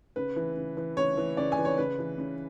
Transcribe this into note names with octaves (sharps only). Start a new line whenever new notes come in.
C#3 B4
E3
C#3
E3
C#3 C#5
E3
C#3 D5
G#5
E3
C#5
C#3 B4
E3
C#3